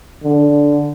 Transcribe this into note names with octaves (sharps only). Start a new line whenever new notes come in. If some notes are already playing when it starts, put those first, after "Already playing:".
D3